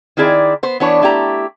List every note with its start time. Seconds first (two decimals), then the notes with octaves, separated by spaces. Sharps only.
0.17 D#3 C4 E4 G#4 D5
0.63 B3 C5
0.80 E3 B3 D4 C#5
1.02 A3 E4 G4 A#5